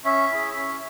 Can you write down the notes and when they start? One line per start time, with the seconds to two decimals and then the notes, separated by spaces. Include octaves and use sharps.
0.05 C#4 E5
0.31 E4 G#4
0.57 C#4